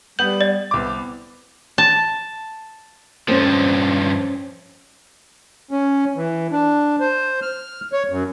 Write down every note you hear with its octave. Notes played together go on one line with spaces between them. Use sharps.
G3 B3 G6 F#7
D5 A6
C2 B3 D6
A5
G2 F3 C4 C#4
C#4
E3
D4
C5
F6
C#5
F#2